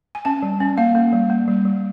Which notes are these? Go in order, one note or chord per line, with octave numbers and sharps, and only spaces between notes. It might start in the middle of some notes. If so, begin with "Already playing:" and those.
G#5
C#4 A5
G3
C#4
A#3 F5
A#3
G3
A#3
G3
G3